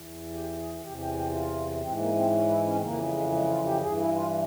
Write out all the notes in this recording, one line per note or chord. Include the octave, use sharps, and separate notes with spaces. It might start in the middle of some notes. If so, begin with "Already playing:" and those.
Already playing: E2 E3
G4
G4
G#4
E2 C3 E3 G4
G4
G4
F4
G#2 E3 C4
A#3
C4
C#4
E4
C#4
C4
F2 C#3 E3 A#3
G#3
G#3
F4
G4
G2 E3 G#4
E4
F4